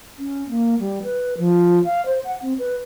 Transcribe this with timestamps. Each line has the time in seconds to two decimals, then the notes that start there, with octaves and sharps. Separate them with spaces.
0.19 C#4
0.49 A#3
0.79 G3
1.04 B4
1.38 F3
1.84 F5
2.06 C5
2.25 F#5
2.42 C4
2.59 B4